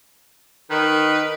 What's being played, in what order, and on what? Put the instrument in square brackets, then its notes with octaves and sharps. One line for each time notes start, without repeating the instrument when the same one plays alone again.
[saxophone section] D#3 [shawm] B4